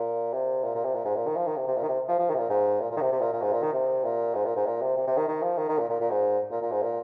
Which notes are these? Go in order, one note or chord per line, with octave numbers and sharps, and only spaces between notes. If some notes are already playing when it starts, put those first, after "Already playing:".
Already playing: A#2
C3
A#2
A#2
C3
A#2
G#2
A#2
D#3
F3
D#3
C3
C3
A#2
D#3
C3
F3
F3
D#3
C3
A#2
G#2
A#2
A#2
D#3
C3
C3
A#2
A#2
G#2
A#2
D#3
C3
A#2
G#2
A#2
G#2
A#2
C3
C3
C3
D#3
D#3
F3
D#3
D#3
A#2
A#2
A#2
G#2
A#2
A#2
G#2
A#2